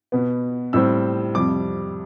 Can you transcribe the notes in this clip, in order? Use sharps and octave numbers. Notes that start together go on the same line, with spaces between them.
B2 B3
A2 G3 C4 E6
F2 C3 G3 D6